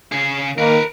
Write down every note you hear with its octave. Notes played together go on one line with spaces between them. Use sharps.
C#3 G#4
D#3 A#3 A#4 B4